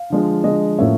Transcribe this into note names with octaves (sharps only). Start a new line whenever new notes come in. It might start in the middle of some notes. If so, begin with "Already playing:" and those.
Already playing: F5
D3 F3 G#3
D3 F3 G#3 D#5
A2 F3 A#3 C#4 E5